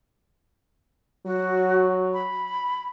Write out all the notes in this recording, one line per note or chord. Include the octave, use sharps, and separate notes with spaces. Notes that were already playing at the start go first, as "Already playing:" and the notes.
F#3 F#4
B5